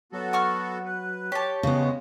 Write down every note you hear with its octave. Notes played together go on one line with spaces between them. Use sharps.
F#3 B3 F#4 A4
F#5 C#6 F6
B4
G4 C#5 A5
E2 C#3 G#3 B3